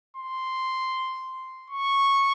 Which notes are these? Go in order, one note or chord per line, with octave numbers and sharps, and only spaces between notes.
C6
C#6